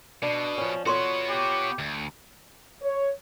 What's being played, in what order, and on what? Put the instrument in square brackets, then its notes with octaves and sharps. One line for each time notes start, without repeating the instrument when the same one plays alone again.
[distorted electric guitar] B2 [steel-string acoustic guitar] D4
[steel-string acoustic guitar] F3 C#4
[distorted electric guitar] B3 F#4 [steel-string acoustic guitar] F4 C#5 [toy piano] A4 C6 C#6
[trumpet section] G4
[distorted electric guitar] D2
[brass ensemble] C#5